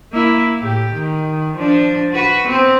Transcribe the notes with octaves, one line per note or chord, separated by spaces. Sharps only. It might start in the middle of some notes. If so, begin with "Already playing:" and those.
A#3 E4
A2 G4
D#3
F3 D4
F#4 B4
B3 C4